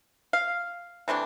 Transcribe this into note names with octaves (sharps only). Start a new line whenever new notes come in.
F5
C3 E3 A3 D4